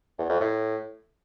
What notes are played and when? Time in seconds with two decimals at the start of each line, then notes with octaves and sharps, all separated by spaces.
0.18 E2
0.29 F2
0.40 A2